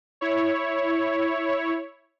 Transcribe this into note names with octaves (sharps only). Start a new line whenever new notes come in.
E4 C#5